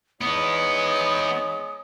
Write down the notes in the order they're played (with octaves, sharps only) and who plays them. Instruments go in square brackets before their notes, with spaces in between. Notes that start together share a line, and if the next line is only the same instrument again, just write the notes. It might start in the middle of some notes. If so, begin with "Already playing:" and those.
[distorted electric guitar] E3 B3 [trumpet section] G#3 D#4 C#5 [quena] D#6